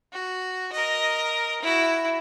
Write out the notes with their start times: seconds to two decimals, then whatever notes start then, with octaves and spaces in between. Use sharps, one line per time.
0.13 F#4
0.73 A#4 D#5
1.62 E4 F#4